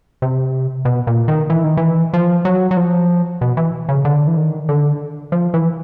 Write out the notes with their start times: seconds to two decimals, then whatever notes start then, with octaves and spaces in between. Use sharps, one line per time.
0.22 C3
0.85 B2
1.07 A#2
1.28 D#3
1.50 E3
1.64 D#3
1.77 E3
2.13 F3
2.45 F#3
2.71 F#3
2.77 F3
3.41 B2
3.57 E3
3.89 C#3
4.05 D3
4.27 E3
4.37 D#3
4.69 D3
5.32 F3
5.54 E3